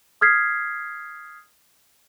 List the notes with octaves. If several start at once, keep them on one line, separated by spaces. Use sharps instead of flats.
D#6 F6 G#6 B6 C7